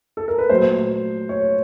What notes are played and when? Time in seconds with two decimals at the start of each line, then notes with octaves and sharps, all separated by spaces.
0.17 A4
0.28 A#4
0.38 B4
0.49 A#2 F#3 A3 C5
1.29 C#5